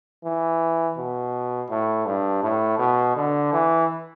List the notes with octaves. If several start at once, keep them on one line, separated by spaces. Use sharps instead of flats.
E3
B2
A2
G2
A2
B2
D3
E3